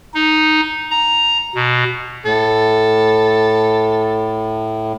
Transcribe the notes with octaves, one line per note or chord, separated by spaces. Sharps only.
D#4
A#5
B2
A2 A4